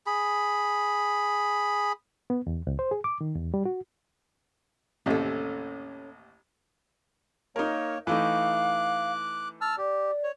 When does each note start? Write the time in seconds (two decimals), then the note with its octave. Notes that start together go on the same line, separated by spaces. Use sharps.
0.07 G#4 B5
2.30 B3
2.47 E2
2.67 C#2
2.79 C5
2.91 G#4
3.04 D6
3.21 D#3
3.36 E2
3.54 G3
3.65 F#4
5.06 A1 D#2 C3 C#4 A4
7.56 A#3 D#4 A#4 C#5
8.07 E3 A3 D#4 F5 D6 F#6
9.61 A5 E6 F6
9.78 G4 D5
10.23 C#5